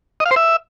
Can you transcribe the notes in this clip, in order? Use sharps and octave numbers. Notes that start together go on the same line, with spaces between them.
D#5
F5
C5
E5